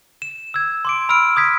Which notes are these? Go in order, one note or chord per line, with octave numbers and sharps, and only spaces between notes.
E7
E6 G#6
C6 D6 D7
B5 E6 F6 D7
D#6 G#6 B6